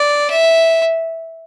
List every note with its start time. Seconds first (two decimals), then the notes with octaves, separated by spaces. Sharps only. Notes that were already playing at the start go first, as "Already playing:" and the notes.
Already playing: D5
0.30 E5